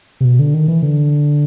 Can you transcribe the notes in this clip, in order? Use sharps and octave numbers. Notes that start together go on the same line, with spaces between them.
C3
B2
D3
D#3
E3
D3